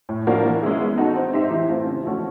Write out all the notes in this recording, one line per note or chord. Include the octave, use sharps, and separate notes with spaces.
A2
F3 A#3 D4 F#4
E3
G#3 C#4 E4 G#4
B3
D#4 F#4 A4
C4
D#4 G4 C5 E5
E3
A3 C4 F4
C#3
F3 A3 C#4 F#4